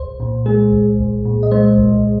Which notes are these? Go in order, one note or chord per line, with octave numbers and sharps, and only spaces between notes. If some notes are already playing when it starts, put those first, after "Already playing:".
Already playing: C2 C5
A#2
G#3 G#4
C2
C2
A#2
D#5
G#3 C5
C2